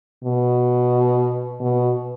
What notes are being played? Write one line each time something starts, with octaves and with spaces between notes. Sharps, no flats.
B2
B2